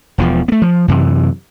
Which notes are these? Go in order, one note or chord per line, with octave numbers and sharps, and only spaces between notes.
E1 E2 F3
A3 B3
F3
F#2 C3 E3